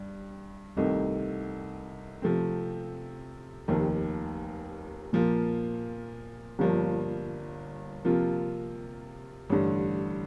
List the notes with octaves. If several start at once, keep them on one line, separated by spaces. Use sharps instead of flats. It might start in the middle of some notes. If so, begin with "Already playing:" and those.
Already playing: G2 G3
C2 C3 D#3 A3 D#4
C3 F3 A3 C4
F1 D#2 D#3
A#2 F3 A#3 F4
G1 G2 F3 A#3
C3 F3 A#3 F4
A1 G2 D3